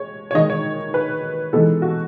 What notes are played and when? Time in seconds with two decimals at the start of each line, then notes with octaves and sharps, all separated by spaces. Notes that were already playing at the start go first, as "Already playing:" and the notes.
Already playing: G#3 C#5
0.31 C#5
0.34 D#3 G#3 D#4 D#5
0.50 C#5
0.94 B4
1.53 E3 G#3 B3 D#4 A4
1.82 F#4